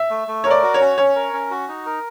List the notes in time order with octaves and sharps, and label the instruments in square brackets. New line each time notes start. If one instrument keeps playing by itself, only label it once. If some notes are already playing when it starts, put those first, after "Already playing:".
Already playing: [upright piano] E5
[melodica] A3
A3
[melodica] A#4 [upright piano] C#5
[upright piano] D5
[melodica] F#4
[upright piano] C#5
[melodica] C#4
[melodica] C#4 [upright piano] C#5
[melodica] A#4
C#4
F#4
D#4
A#4